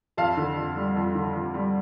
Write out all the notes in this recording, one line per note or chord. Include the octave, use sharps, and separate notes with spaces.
F2 F5 A5
D3
F2
G3
F2
D3
F2
G3